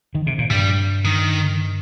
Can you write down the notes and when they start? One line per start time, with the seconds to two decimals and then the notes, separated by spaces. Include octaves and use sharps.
0.15 D#3
0.27 C3
0.38 A#2
0.50 G2 G3
1.05 D#3